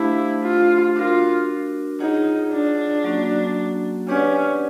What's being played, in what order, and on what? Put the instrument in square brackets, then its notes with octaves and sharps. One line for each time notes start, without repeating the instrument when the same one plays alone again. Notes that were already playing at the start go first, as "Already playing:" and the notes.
Already playing: [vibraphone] A3 D4 G4 C5 F5 [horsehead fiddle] E4
[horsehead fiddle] F4
[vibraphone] D4 F#4 A#4 [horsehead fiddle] F4
[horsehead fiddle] D#4 [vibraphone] F4 G#4 C#5 F#5
[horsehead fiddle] D4
[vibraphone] F#3 A#3 C#4 F#4
[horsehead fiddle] C#4 [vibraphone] D4 G4 B4 D5 F#5